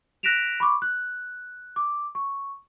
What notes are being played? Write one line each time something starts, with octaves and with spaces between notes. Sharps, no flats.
F#6 A#6 B6 D7 E7 F7
B5 C#6 D6
F#6
D6
C#6